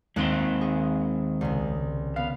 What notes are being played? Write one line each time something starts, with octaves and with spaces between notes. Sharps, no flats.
D#2 G#3 C4 C6 F#6 D#7
G#4
C2 C#3
B3 F5